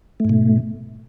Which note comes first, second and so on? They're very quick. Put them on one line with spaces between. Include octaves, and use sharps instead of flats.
A3 G#2 B2